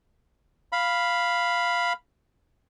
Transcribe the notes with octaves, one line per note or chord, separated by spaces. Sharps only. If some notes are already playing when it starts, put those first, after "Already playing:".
F5 B5